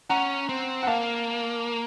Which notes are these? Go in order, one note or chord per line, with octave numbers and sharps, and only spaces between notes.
C#4 F#5 A#5
C4
F#5
A#3 F5 A5